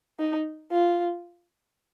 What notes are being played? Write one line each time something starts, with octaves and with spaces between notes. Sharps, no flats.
D#4
F4